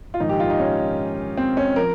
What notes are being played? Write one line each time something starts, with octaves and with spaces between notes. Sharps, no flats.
F4
A#1 G#2 D#3 D#4
G4
F4
D#4
C#4
C4
C#4
F3 A#4